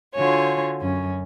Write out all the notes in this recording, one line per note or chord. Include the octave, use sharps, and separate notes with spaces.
D3 F4 F#4 C#5 G#5
F#2 C#4